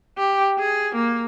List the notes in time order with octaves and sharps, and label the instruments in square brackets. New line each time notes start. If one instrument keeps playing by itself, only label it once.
[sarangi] G4
G#4
A#3